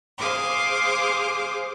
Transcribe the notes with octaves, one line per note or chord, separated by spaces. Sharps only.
G#4 C5 F5 D6 D#6